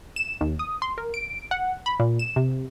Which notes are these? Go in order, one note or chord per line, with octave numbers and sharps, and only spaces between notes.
E7
D#2
D#6
C6
A#4
D7
F#5
B5
A#2
E7
C3